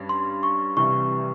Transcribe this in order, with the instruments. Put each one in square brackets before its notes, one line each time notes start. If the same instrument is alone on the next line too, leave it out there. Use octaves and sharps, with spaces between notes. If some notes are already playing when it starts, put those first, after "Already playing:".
Already playing: [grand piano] G2 G3 C#4
[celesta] C6
C#6
[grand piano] C2 C3 E3 G3 [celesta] C#6